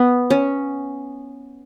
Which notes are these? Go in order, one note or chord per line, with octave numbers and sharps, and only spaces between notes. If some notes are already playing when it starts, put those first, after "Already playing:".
Already playing: B3
C#4